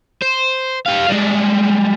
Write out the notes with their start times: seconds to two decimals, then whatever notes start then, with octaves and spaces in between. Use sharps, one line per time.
0.22 C5
0.86 G4 F5
1.09 G3 G#3